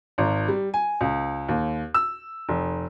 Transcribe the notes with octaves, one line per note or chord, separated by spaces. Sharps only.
G#1
G3
G#5
C#2
D#2
E6
F1